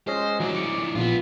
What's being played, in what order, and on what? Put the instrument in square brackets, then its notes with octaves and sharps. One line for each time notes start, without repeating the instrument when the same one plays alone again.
[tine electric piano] G#3 C#4 D#5 [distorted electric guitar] C5
[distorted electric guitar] E3 D4 [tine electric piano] F#3
[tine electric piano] D6 C#7
[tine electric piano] A#1 [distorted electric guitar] B3 F4